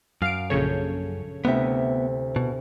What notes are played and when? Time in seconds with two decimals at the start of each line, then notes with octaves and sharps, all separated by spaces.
0.22 F#2 F5 D7
0.50 A#1 C#3 A4 C#5 G6
1.45 D2 C3 B3 E4 E5
2.36 B2